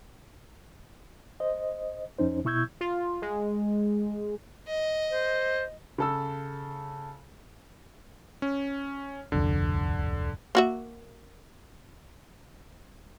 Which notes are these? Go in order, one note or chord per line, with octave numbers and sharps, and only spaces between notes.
C5 D#5
F2 C#4 D#4 C5
B2 E4 C#6 E6 G6 G#6
F4
G#3
D#5
C5
C#3 A4 E6
C#4
D1 C2 F2 D3
A#3 F#4 E5